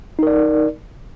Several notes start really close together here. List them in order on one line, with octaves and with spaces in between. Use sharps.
D#4 A#4 D5